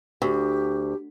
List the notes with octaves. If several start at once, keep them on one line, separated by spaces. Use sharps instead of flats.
D2 G4